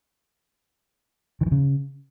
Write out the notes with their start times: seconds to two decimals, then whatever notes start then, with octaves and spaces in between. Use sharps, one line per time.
1.41 D#3
1.46 E3
1.52 C#3